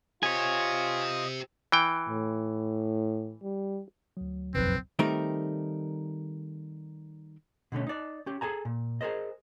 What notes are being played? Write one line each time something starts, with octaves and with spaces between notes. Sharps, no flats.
F4 G4 C5 C#5 D#5 G#5
E3 G5
A2
G3
D2 F#3
F#1 B1 F2 C4 B4
D#3 G3 A3 C4 D#4 A#4
B2 D3 A3 C#4
D#4 D5
C#4 G4
G#4 A4 G#5 A#5
A#2
G#4 A#4 C5 D#5